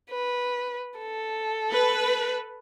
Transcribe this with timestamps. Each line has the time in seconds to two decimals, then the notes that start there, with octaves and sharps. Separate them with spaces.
0.11 B4
0.99 A4
1.72 B4